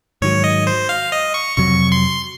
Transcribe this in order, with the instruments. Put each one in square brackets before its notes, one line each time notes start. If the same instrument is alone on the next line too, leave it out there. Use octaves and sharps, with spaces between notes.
[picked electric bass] G#2 D#3 F#3 [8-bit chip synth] C#5
[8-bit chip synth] D#5
C5
F5
D#5
C#6
[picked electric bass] F2 C3 F#3 [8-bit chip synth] C#6
[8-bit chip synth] C6